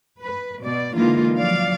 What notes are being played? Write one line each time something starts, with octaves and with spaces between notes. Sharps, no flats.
B4
B2 D5
D3 E3 G#3 A#3 D#4 F4
F3 F#3 D5 F5